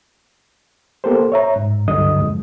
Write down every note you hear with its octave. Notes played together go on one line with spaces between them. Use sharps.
A#3 B3 G4 A4 A#4 C5
C#5 E5 A#5
G#2
C#2 G2 D3 F#3 D#5 D#6
F2 G#3